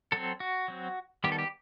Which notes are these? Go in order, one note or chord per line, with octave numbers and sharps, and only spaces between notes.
F#3 C4 A4
F#4
F#3 C4
D#3 G3 B3 G4
A4
G4